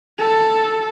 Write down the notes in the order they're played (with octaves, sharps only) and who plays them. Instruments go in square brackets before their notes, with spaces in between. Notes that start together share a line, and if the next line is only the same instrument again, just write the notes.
[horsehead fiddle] A4